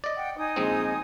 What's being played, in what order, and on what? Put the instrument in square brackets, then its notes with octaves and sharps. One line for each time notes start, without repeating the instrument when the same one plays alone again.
[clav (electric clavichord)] D5 D#5
[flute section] F#5 G5
D#4 G#5 D#6
[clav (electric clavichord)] A#1 G#3 C4